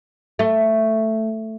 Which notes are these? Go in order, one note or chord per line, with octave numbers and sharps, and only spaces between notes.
A3